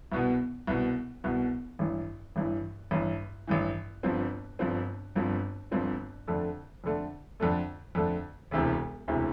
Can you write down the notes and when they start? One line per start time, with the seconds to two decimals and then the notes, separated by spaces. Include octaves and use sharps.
0.12 C2 B2 B3
0.67 C2 B2 B3
1.24 C2 B2 B3
1.79 A1 G2 E3
2.36 A1 G2 E3
2.91 A1 G2 E3
3.47 A1 G2 E3
4.03 G1 G2 F3 C4
4.59 G1 G2 F3 C4
5.15 G1 G2 F3 C4
5.71 G1 G2 F3 C4
6.28 F2 D3 A3
6.84 F2 D3 A3
7.40 F2 D3 A3
7.95 F2 D3 A3
8.51 E1 D2 C3 E3
9.08 E1 D2 C3 E3